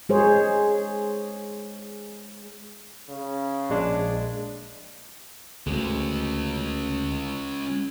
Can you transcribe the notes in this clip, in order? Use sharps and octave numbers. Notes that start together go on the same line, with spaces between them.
G#3 G#4 C5 C#5
C#3
A#1 G#3 D4
D2 G#3 C#4